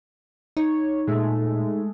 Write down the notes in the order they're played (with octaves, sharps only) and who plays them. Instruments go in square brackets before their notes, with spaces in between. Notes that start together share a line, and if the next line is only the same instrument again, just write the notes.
[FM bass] D#4 [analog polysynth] C#5
[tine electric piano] A#2 [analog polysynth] G#3 A3